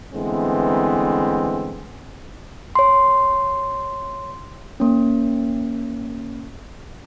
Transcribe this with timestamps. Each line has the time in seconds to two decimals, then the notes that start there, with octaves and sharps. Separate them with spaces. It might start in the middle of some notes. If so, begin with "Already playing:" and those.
0.13 D3 E3 G#3 A3 B3 C4
2.75 C#5 C6
4.80 A#3 C#4